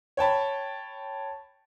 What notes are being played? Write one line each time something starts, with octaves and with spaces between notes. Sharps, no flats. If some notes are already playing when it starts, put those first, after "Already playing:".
C#5 G5 A5 B5